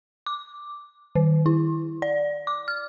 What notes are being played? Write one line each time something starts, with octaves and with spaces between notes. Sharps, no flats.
D6
D#3
E4
D5
D6
F6